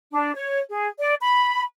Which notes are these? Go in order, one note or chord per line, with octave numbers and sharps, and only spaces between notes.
D4
C#5
G#4
D5
B5